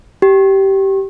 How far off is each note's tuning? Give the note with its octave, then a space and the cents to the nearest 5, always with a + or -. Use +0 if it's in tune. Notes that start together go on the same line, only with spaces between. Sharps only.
G4 -15